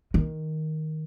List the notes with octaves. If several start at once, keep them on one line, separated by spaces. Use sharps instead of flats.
D#3